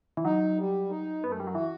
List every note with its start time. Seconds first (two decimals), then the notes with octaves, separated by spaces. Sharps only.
0.17 E3
0.24 F#3 D#4
0.57 G3
0.90 D#4
1.22 F#2 B3
1.32 A3
1.40 G3
1.47 F#3
1.54 E3 F#4